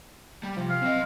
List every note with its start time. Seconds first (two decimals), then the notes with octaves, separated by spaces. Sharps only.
0.43 G3
0.57 C3 F3
0.70 F5
0.82 F#3 C4 D#5